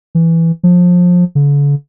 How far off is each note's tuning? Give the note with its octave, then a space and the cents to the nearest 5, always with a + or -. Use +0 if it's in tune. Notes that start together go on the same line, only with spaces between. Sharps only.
E3 +5
F3 +25
D3 -45